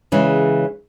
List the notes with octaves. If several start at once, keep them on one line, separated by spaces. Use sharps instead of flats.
C#3 E3 G#3 C#4